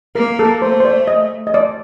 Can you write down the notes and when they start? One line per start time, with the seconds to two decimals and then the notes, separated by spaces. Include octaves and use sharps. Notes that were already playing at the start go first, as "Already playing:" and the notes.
0.15 A#3 A#4
0.39 A4
0.61 A3 C5
0.80 C5
0.85 D5
1.07 D#5
1.47 D#5
1.54 D5